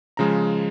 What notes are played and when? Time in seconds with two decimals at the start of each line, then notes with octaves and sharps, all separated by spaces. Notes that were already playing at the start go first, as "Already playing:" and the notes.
0.17 C#3 F3 G#3 A#5